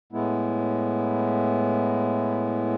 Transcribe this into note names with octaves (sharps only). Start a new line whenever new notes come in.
A2 G#3 B3 E4